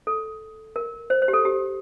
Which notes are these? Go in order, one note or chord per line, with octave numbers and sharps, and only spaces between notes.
A4
A#4
C5
C5
G4
A4
G4